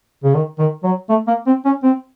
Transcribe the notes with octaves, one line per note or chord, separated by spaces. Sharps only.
C#3
D#3
D#3
F#3
A3
A#3
C4
C#4
C4